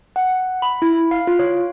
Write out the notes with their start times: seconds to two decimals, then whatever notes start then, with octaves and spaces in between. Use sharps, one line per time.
0.16 F#5
0.62 B5
0.82 E4
1.11 F5
1.27 F4
1.39 C#5